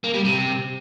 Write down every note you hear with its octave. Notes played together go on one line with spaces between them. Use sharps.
A#3
G3
C3